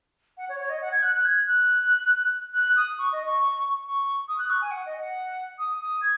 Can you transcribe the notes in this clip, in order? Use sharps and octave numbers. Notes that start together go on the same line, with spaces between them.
F#5
C#5
C#5
D#5
F#5
G#6
F#6
F#6
G#6
F#6
F#6
D#6
C#6
D#5
C#6
C#6
D#6
F#6
C#6
G#5
F#5
D#5
F#5
D#6
D#6
G#6